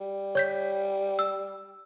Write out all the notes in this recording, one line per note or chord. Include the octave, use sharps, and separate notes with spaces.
G3
C#5 G6 B6
E6